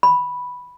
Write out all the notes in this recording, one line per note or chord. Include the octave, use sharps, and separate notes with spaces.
B5